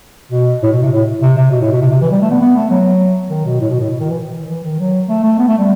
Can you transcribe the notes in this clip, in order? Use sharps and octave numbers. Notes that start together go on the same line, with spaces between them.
B2
A2
B2
C3
A2
C3
C3
B2
A2
B2
C3
C3
E3
G3
A3
B3
B3
A3
F#3
D#3
B2
A2
B2
A2
B2
D#3
E3
E3
D#3
F#3
A3
A3
B3
A3
G3